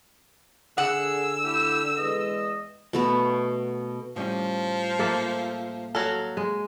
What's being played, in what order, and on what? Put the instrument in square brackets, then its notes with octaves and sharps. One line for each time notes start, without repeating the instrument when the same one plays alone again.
[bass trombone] D3 [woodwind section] G#4 [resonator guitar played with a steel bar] F#5 [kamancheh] E6
[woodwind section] A3 E4 G4
E2 G#3 D#5
[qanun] B2 A3 B3
[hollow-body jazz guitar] A2 G3 C#4 [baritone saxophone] F3
[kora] A#3 A4 E5
[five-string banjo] F#3 A4 [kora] F5
[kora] G#3